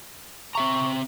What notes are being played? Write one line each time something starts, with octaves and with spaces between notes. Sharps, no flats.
C4 E5 A#5 C#6